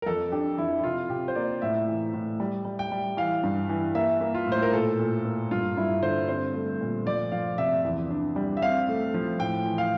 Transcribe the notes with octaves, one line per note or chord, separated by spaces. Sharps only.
A#4
F2 A4
D4 G4
F2 E4
E4
C3 F4
C3 G4
C5
A#3 D5
A2 E5
E3
A2
G3
G3
G5
G3
E3 F5
G2
E3
A#3 E5
A#3
F4
A2
C5
A#4
A#2 A4
A#2
A#3
G2 F4
G2 E4
D3 C5
C4 C5
A3
A#2
F3 D5
F3 F5
C3 E5
E2
D4
G3
E5
C4 F5
A3
F3
A2 G5
E3
F5